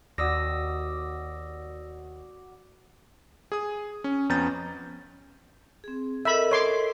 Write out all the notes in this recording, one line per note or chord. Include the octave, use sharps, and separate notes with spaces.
D#2 F#4 D5 D#6 E6 A#6
G#4 D#6
C#4
F2 B3 C#4 A#5 G6 A6
C4 G#4
A4 A#4 D#5 E5 B5
C#5 C6 D6